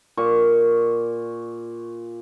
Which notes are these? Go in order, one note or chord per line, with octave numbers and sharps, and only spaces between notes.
A#2 C#6